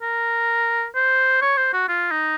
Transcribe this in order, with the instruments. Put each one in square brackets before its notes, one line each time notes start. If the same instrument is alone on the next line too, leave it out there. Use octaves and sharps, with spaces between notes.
[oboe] A#4
C5
C#5
C5
F#4
F4
D#4